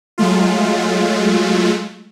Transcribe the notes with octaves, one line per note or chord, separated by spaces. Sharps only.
F#3 G#3 A3 F4